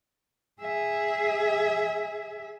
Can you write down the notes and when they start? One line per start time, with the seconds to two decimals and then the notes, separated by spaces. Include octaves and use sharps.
0.61 G#4 E5